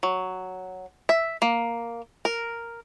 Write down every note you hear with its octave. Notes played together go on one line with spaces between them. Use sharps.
F#3
E5
A#3
A#4